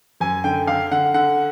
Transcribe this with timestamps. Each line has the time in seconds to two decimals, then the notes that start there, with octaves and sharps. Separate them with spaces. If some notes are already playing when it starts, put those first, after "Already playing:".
0.20 F#2 G#5
0.44 D3 G5
0.67 D3 F5
0.91 D3 F#5
1.14 D3 F#5